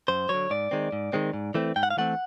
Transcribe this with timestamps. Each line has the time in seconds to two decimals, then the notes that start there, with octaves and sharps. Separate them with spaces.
0.08 F#2 C5
0.29 D3 F#3 C#5
0.50 G#2 D5
0.71 D#3 G#3 C4
0.93 G#2
1.13 D#3 G#3 C4
1.34 G#2
1.55 E3 A3 C4
1.76 G#2 G5
1.83 F#5
1.90 F5
1.97 E3 A3 C4 F#5